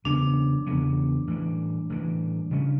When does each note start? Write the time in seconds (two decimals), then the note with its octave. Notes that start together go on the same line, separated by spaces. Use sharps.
0.05 E2 C#3 F#3 B3 D4
0.66 E2 C#3 F#3 B3
1.27 A2 E3 G3
1.90 A2 E3 G3
2.51 C#3 G3 C#4